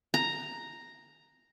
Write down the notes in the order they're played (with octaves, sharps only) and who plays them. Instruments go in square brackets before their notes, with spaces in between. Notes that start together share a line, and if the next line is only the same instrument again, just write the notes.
[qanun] A#5